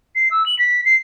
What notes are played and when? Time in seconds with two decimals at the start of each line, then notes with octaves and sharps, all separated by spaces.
0.15 C7
0.31 E6
0.46 F#7
0.59 B6
0.85 C7